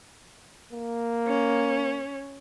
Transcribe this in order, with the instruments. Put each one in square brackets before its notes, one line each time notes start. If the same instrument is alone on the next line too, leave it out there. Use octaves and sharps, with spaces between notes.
[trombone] A#3
[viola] C#4